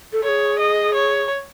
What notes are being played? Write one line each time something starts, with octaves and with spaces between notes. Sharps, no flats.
A4
A4 C#5
G#4
D#5
C#5